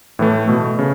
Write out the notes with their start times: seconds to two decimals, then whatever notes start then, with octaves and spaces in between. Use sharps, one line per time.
0.19 A2 E3 A3
0.48 B2 A3
0.79 C#3